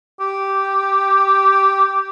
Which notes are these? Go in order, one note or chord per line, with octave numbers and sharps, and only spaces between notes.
G4